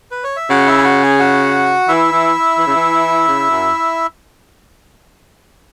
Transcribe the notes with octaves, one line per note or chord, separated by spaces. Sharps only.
B4
C#5
E5
C#3 F#4 F#5
E4 E5
G#5
F#4 F#5
G#4 G#5
F#4 F#5
E3 E4 E5
E3
E3
C#3
E3
C#3
F#2